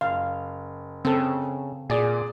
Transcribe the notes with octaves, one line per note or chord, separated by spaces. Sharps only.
F#1 F5
C#3 C4 A4
A#2 G#4 D5